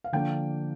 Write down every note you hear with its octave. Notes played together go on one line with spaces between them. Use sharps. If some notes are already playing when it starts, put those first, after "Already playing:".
F5
D3 F3 A#3 D4 G5